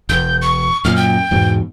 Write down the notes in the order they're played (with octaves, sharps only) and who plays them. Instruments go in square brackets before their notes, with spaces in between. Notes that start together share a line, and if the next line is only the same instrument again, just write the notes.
[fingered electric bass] E1 [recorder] G6
[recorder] C#6
[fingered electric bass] F#2 A#2 [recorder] F6
[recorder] G5
[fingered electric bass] E2 G#2 B2